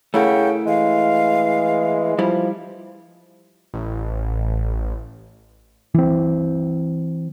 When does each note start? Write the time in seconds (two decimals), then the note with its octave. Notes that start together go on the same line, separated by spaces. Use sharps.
0.14 C#3 A3 E4 A#4 F#5 G5
0.66 E3 G#3 F5
2.19 F3 G3 E4
3.74 A1
5.94 E3 C4